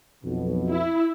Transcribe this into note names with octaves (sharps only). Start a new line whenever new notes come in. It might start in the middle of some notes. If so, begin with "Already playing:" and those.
B1 F2 B2
E4